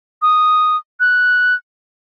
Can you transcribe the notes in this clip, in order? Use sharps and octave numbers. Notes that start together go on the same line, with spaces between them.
D#6
F#6